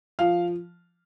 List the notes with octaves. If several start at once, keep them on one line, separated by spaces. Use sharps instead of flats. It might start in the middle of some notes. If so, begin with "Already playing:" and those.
F3 F5